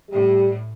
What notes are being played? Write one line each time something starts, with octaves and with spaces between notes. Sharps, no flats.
A2 G3